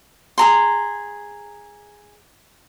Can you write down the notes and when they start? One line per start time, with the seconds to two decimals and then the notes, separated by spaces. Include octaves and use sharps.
0.38 G#4 A#5 C6